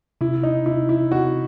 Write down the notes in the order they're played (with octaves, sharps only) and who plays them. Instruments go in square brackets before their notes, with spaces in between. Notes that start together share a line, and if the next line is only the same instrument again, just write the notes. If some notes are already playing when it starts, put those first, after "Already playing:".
[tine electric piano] C3 [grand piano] E4
[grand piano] D#4
[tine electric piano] C3 [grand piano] E4
[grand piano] E4
[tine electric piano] C4 [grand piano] F#4